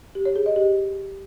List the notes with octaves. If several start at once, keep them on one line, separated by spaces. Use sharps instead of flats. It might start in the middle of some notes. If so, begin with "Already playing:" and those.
G4
C#5
G#4
D#5
G4